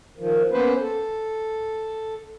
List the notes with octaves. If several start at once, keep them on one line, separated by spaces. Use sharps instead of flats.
D#3 F3
A#3 B3 C#4 B4 C5
A4